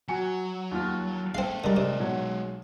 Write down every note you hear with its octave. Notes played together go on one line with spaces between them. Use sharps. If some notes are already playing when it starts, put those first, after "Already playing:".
F#3 F#4 G#5 C#7
D#2 F4 F6
G#3 C4 A4 F5
D3 G3 G#3 A4 A#4 D5 D#5
C3
B1 F#3 C#5